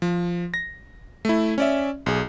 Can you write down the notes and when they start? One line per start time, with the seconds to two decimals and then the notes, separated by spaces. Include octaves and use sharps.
0.02 F3
0.54 A#6
1.25 A3 E4
1.58 C#4 D5 E5
2.06 B1 G#4